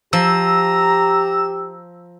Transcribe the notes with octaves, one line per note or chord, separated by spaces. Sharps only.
F3 G4 A#5 E6